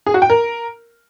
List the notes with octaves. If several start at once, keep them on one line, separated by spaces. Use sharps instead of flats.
G#4
F#4
G5
A#4